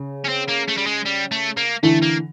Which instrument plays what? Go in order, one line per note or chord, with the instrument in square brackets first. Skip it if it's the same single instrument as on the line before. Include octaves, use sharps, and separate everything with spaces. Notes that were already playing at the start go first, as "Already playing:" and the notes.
Already playing: [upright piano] C#3
[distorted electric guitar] C#4
C4
A#3
A3
G3
G#3
G3
A3
A#3
[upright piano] D3 E3 [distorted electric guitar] A3
[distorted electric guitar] A#3